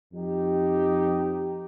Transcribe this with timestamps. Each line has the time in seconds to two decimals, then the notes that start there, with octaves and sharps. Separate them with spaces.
0.12 F2 F3 D#4 G4